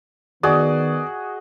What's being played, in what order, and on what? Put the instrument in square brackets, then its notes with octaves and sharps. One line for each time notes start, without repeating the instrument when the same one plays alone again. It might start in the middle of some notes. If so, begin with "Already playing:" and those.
[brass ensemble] D#3 B3 [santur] F#4 G#4 D#5 [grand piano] D5